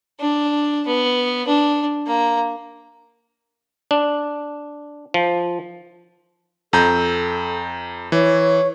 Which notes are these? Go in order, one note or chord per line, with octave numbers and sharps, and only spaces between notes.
D4
B3
D4
A#3 A#5
D4
F3
F2 A4 A#5 G6
E3 C#5